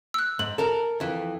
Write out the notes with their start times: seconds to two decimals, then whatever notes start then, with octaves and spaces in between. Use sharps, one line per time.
0.14 E6 F#6
0.39 G#2 F#7
0.58 A4 A#4
1.00 F2 E3